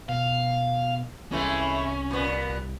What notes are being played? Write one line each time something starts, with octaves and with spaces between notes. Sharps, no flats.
B2 F5
C2 E3 G#3 A3 C#4
A#2 B3